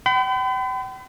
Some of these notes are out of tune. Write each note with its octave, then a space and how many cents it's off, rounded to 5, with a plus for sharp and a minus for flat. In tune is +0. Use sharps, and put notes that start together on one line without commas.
G5 -40 B5 +40